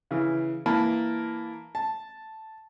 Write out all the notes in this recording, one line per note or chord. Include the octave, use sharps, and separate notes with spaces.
C#3 E3
E3 A#3 A5 B5
A5